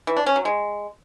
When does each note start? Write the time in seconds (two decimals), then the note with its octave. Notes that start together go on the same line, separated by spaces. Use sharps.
0.07 E3
0.17 D4
0.26 C#4
0.36 F#3
0.45 G#3